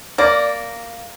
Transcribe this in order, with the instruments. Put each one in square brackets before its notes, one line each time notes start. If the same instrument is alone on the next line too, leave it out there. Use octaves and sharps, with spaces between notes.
[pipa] A#3 [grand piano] D5